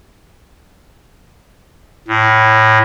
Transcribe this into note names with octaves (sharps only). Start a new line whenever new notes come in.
A2